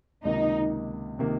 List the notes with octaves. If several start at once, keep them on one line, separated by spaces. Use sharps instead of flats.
C#2 C3 D#3 A#3 D#4
C3 D#3 A#3